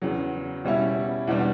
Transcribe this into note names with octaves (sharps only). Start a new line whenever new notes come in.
E2 C#3 F#3
B2 G3 C#4 E4
E2 B2 G3 D4